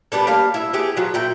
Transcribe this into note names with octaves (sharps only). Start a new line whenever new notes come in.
G3 B3 D4 A4
G3 A#3 F5
E4 E5
B3 G4 G#4
F3 F#3
A#2 E4 G5